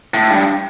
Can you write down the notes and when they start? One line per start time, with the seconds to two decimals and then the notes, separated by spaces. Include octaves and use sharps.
0.14 A2
0.30 G2